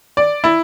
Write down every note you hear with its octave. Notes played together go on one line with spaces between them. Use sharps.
D5
E4